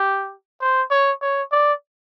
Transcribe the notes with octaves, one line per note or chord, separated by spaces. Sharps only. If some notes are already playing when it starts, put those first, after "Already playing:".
Already playing: G4
C5
C#5
C#5
D5